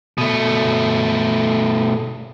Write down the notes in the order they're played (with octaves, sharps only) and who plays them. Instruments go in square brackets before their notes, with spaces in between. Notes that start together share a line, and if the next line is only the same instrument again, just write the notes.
[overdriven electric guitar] B2 A3